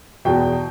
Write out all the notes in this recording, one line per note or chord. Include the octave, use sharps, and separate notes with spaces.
E2 B2 G5